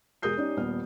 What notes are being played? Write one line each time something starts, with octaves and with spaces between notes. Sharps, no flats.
E1 G#4 A#4 D#6 G6 C7
C#4 D#4 G4 D5
D#1 B3 F6